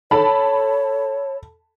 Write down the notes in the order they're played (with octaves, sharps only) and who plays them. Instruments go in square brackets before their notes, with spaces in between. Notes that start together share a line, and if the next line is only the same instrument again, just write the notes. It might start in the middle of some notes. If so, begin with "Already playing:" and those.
[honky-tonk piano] A4 A5 B5 [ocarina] C#5